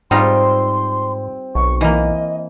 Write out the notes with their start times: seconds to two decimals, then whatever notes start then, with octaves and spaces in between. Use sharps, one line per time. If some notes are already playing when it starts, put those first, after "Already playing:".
0.11 G#2 G3 C4 D#4 F4 C6
1.55 B1 C#6
1.81 E3 A#3 D#5